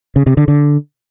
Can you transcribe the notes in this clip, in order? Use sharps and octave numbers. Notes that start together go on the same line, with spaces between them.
C#3
C3
D3
D3